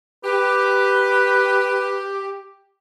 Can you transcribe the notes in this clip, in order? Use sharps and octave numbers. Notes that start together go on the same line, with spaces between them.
G4 B4